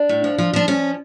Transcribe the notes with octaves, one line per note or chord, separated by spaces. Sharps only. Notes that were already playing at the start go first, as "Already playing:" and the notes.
Already playing: D4
A2
F3
F3
F3 D4
F3 C#4